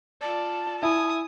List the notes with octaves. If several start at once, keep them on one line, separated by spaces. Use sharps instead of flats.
F4 D5 A5
E4 G#5 D#6